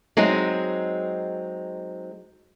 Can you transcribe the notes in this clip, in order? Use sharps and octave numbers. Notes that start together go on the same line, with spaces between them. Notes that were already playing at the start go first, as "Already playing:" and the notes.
F#3 G#3 C4 D#4